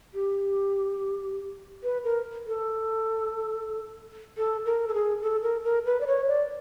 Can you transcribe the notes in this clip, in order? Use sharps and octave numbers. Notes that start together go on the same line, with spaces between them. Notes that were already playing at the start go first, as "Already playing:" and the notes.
G4
B4
A#4
A4
A4
A#4
A4
G#4
A4
A#4
A#4
B4
D5
C#5
D5